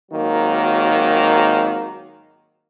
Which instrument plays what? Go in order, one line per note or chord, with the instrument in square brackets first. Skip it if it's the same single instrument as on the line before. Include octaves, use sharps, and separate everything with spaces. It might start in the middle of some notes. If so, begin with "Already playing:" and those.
[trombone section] G#1 D#3 F#3 A#3